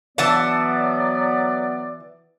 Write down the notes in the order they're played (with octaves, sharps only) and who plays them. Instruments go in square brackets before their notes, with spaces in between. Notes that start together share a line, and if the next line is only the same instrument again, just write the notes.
[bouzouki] E3 F#5 A5 [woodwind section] F#3 B3 D5